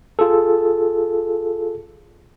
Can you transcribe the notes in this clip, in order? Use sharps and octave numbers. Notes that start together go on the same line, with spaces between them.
F4 G#4 A4